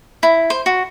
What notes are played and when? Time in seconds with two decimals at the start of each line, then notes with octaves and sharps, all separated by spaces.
0.23 E4
0.50 C5
0.66 F#4